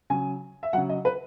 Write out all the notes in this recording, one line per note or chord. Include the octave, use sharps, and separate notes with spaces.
C#3 F#3 G#5
E5
C#3 F#3 F#5
D#5
B4